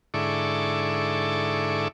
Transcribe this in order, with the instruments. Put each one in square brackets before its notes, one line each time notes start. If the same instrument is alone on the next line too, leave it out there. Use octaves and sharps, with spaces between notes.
[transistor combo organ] G#2 D3 E4 A4 C#6 D6